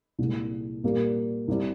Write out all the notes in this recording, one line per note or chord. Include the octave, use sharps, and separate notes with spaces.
C2 A#2 G#3
A#2 G3 A#3
C2 C3 G3